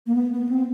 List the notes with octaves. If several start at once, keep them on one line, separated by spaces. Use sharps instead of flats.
A#3
B3
B3
C4